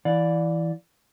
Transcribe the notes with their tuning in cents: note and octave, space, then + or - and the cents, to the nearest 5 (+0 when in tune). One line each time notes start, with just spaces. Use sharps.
E3 +0 D5 +0 F5 +35